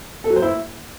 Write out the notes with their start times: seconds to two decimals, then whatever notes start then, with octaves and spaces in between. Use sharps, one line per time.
0.24 A4
0.30 F#3
0.36 C5
0.42 E4